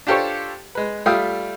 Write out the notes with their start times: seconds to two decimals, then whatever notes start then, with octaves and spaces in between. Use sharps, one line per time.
0.07 D4 F4 G4 A4 C5 C#5
0.75 G#3 B4
1.06 G3 A3 F4 E5 G5 D#6